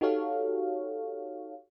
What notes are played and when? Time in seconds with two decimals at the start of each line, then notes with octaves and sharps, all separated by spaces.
0.01 D#4 F#4 G4 A4 C#5 F5